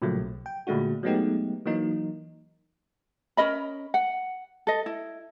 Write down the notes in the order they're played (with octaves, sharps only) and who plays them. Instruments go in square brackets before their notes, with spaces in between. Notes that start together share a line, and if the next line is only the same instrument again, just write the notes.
[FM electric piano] A#2 C#3 F3 F#3 A3 A#3
B1
G5
A#2 D3 G#3 A3 D4 F#4
F#3 G#3 A3 B3 D#4 G4
E3 F#3 A#3 D#4
[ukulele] C#4 A#4 D#5 B5
F#5
A4 D#5
E4